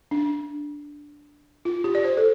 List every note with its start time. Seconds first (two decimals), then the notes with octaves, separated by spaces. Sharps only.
0.11 D4
1.65 F4
1.84 G4
1.95 D5
2.04 C5
2.17 A4